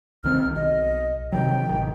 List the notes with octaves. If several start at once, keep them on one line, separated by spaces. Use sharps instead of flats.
C2 D#3 C4 F6
B1 D#5
C3 D#3 F#3 G5
A1 D#3